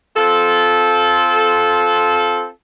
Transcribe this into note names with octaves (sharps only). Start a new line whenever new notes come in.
C4 F4 A4